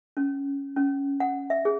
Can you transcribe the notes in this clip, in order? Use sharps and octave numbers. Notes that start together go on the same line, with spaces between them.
C#4
C#4
F#5
E5
G#4